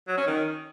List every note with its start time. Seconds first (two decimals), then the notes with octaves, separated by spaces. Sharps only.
0.08 F#3
0.18 C#4
0.27 D#3